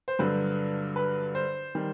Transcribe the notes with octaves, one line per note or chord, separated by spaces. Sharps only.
C5
G2 D3 F#3 B4
B4
C5
D#3 G3